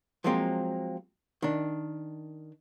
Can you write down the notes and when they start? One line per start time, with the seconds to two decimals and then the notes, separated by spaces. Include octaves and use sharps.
0.24 F3 F#3 G#3 A#3 C4
1.42 D#3 D4